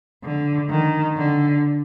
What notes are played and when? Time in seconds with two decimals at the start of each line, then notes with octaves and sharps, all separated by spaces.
0.23 D3
0.70 D#3
1.17 D3